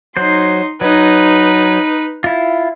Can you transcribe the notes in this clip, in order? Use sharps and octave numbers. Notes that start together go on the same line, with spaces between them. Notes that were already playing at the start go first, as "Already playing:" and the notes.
F#3 D#4 C5 C6
F#3 D#4 B4
E4 F4